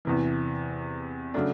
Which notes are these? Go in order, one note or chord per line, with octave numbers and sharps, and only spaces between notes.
E2 C3 E3
C#3 F#3 A3 D4